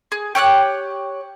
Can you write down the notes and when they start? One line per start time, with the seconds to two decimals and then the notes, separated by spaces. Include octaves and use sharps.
0.12 G#4
0.35 G4 C#5 F6 F#6